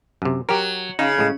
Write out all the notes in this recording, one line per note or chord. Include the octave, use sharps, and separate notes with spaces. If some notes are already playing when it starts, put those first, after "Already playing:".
F#2 C3
F#3 G4 A#4
C#3 D#4
A2 G#3